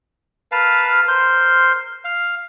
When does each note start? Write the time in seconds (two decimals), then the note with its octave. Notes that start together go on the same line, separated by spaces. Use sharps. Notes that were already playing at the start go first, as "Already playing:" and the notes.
0.52 A#4 B4 F5 A5
1.08 A#4 C5 C6
2.05 F5